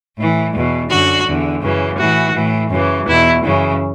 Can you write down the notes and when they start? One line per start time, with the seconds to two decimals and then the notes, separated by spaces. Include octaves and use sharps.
0.17 A2 E3
0.53 E2 B2
0.89 F#2 D3 F#4
1.25 E2 D3
1.61 F#2 C#3 E3
1.97 A2 E3 F#4
2.34 A2 E3
2.70 F#2 C#3 E3
3.06 E2 B2 E4
3.42 F#2 C#3 E3